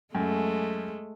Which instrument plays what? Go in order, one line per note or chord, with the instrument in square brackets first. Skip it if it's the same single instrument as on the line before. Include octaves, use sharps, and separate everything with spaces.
[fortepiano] F#2 [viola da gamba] G#3 A3